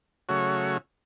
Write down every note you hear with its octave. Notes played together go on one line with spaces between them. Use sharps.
C#3 F#3 A3 F#4 C#5